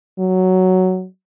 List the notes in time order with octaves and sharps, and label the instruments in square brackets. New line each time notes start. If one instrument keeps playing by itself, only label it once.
[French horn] F#3